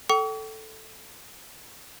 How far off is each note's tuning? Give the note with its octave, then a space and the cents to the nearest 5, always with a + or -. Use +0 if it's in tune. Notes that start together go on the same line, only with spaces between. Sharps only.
A4 +0 G5 -35 C#6 +45